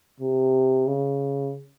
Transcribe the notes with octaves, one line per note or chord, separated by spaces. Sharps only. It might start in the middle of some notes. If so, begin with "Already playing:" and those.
C3
C#3